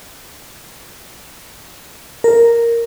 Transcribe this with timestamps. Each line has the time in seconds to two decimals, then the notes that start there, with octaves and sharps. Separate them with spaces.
2.24 A#4